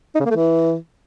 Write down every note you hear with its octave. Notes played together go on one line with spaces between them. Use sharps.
D#4
C#3
A#3
A3
E3